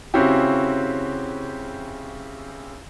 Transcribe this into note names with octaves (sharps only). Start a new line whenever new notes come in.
C#3 C4 C#4 E4 F#4 G4